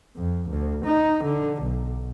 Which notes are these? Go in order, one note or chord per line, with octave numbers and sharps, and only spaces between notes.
F2
D2
D#4
D3
B1